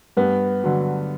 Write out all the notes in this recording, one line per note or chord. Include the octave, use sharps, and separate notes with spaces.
G2 B3
D3 F#3